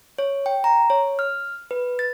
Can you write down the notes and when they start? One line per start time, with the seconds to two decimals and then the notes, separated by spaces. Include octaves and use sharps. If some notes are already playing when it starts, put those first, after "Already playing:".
0.18 C#5
0.46 G5
0.64 A#5
0.90 C#5
1.19 F6
1.71 B4
1.99 A6